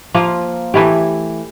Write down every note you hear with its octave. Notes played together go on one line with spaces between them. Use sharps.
F3 A#3 F4
E3 A3 E4 G4